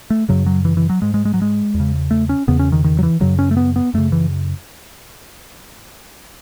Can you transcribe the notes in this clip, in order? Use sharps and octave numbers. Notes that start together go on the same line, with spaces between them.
A3
F#2 C#3 F#3
F#3
E3
E3
F#3
G#2 G#3
G#3
G#3
F#3
G#3
E2
C#3
A3
C#4
E2 C#3 B3
C#4
D#3
D#3
F#3
E3
F#2 C#3 F#3
C#4
A3
B3
B3
F#2 C#3 A3
E3